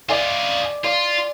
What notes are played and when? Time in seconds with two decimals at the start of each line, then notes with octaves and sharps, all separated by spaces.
0.09 F4 G#4 D5 E5 G#5
0.84 F4 D5